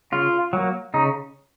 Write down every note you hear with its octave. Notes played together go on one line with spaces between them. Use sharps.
C#3 F4
F#3 A#3
C#3 D#4